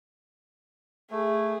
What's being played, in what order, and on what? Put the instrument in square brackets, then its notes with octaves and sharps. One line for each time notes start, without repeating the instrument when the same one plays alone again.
[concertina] A3 [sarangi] G#4